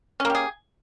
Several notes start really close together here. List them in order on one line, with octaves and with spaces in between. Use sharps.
C#4 A#3 G4 G#4